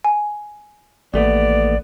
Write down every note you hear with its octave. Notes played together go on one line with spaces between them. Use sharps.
G#5
A1 D#2 A3 B3 D5